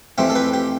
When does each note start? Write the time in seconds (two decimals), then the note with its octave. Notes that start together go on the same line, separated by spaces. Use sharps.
0.18 F2 E3 A3 C4 G4
0.30 A4
0.35 G4 B4
0.54 G4